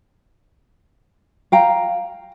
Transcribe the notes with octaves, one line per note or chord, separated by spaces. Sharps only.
F5 G5 A#5